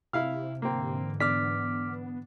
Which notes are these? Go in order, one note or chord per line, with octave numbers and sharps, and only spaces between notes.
C3 E4 F5 F6
G#2 D3 E3 A#3 C4
B3 D4 D6 F6 B6